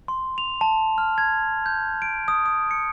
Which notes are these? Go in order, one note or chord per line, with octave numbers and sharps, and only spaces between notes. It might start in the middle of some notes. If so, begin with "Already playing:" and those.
C6
F7
A5
F6
G#6
G6
D7
D#6
D#6
C#7